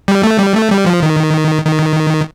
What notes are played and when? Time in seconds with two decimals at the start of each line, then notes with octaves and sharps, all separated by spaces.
0.08 G3
0.23 A3
0.39 G3
0.55 A3
0.71 G3
0.86 F3
1.03 D#3
1.65 D#3